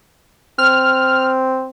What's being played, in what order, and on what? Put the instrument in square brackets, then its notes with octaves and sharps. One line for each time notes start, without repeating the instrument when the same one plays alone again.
[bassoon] C4 [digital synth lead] F6